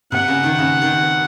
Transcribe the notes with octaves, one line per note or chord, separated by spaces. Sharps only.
C3 F#5
C#3
D#3
C#3
D#3